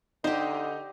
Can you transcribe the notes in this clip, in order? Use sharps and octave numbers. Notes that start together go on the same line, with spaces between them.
D3 D#4 G4 C5